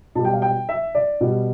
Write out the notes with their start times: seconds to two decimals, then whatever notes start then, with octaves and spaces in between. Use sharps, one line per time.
0.15 B2 G3 A5
0.25 G5
0.33 F5
0.42 G5
0.69 E5
0.95 D5
1.21 B2 G3